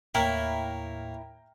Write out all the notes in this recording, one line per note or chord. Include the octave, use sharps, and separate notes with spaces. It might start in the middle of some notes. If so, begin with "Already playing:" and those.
D#2 A2 A#3 E4 C#5 G5 A#5 F6